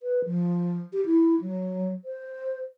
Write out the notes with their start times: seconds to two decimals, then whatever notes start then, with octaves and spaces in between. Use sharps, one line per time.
0.03 B4
0.25 F3
0.93 G4
1.06 E4
1.41 F#3
2.05 C5